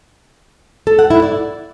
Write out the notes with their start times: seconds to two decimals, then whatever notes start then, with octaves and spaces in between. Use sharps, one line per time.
0.87 A4
0.99 F#5
1.10 E4
1.22 D5